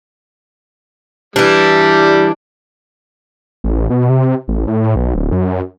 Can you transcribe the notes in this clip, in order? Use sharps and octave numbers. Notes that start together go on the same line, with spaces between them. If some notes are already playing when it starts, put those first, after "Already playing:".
E3 G3 D4
A1
B2
C3
A1
A2
B1
D1
F#2